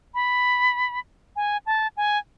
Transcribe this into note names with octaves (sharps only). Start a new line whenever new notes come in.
B5
G#5
A5
G#5